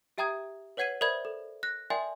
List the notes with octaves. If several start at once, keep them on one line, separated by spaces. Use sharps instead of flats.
G4 E5 G5 A#5 D#6 G#6
B4 C#5 F#5 G#6 C7 D#7
A#4 C5 D5 E5 B5 G#6
A4
F#6 A#6
A#4 D5 E5 G5 G#5 C6